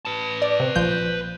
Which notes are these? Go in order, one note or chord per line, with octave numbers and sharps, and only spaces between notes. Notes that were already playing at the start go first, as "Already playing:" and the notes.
B4 A5
D5
C3
A#1 F3 G6